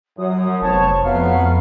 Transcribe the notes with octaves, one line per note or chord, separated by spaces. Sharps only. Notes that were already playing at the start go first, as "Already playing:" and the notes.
F#2 F#3 D#6
F1 B3 C5 C#5 A5 C#6
F2 F#3 A3 B3 F5 F6